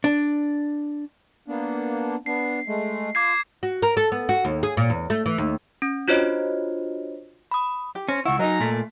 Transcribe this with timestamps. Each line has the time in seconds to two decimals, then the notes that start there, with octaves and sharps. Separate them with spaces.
0.04 D4
1.48 A#3 B3 D4
2.26 B3 D4 C7
2.67 G#3 A3
3.15 F4 D6 G#6 C7
3.63 F#4
3.83 A#4
3.97 A4
4.12 B3
4.29 F#4
4.45 D#2
4.63 G#4
4.77 A#2
4.90 E2
5.10 A3
5.26 E3
5.38 D#2
5.82 C#4
6.08 D4 F4 F#4 C5 C#5 D#5
7.51 B5 D#6
7.95 G4
8.09 C#4 C5 A#6
8.26 C#2 E4 F#5 C#6
8.39 F#3 D#4 A#4 D#5 G#5 A#5
8.60 A#2 A3